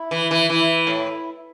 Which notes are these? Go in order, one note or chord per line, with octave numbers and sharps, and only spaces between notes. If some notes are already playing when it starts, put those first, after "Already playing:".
Already playing: E4
E3
E3
E3 E4
A2